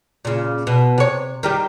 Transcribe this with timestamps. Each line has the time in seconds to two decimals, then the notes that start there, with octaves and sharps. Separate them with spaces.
0.25 A#2 C#3
0.67 B2
0.98 C3 C#5
1.43 D#3 G3 G4